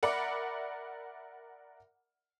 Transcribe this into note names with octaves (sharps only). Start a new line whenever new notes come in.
A#4 D5 E5 F#5 B5